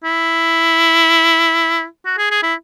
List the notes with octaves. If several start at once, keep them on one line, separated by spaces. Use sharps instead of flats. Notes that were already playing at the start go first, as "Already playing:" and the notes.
E4
F#4
G#4
G#4
E4